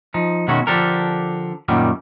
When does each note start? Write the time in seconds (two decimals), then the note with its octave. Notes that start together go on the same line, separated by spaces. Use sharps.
0.14 F3 D#4
0.48 B2 D#3 G#3 C#4 E4 F#4
0.67 D3 F3 D4 G4 A4 A#4
1.68 F#2 A#2 D#3 F#3 G3